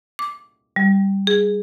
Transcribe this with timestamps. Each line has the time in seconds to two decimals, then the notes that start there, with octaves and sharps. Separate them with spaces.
0.19 D6
0.76 G3
1.27 G#4